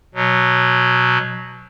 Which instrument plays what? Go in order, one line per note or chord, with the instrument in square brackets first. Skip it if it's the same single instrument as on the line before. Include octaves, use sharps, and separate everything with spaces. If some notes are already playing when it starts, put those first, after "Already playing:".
[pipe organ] B2 F#3